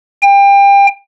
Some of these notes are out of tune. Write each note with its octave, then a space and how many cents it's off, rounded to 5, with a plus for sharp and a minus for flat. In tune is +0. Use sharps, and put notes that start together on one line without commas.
G5 +30